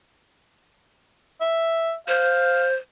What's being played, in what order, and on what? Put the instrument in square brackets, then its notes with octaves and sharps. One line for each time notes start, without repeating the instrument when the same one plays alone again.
[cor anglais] E5
[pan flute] C5 [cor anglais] F5